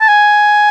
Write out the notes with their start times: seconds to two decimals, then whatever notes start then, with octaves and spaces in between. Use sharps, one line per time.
0.01 A5
0.08 G#5